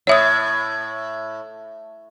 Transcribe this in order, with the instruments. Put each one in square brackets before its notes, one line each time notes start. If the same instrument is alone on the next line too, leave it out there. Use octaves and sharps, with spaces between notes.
[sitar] A2 [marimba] C#5 E5 D#6